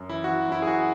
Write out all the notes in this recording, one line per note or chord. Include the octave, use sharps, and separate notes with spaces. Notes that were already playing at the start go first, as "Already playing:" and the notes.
Already playing: F#2
E3 E4
E3 F#4
F#2 E4
G#4
F#2 F#4